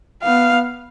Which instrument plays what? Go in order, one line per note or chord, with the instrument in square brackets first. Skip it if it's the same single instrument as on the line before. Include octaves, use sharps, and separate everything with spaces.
[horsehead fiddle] B3 [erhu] F5